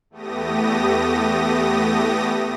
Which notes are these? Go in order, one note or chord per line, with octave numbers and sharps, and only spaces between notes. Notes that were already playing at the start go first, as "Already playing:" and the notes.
E2 A3 B3 G4 D#6 A#6